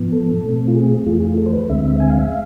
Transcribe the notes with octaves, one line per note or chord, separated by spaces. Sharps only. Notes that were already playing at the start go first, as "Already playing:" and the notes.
Already playing: G#2 F3 B3
A4
B2 A3 C4
F4
G#4
F2 E3 A3 F4
G#4
F4
A4
C5
B4
D2 D3 G#3 C4 E5
E5
G#5
F5
E5
F5